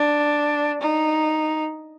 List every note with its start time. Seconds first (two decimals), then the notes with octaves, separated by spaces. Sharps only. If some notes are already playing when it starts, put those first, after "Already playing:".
Already playing: D4
0.81 D#4